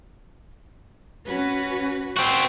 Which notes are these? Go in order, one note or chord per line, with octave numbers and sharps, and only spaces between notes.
C#4 F#4 B4
C4 F#4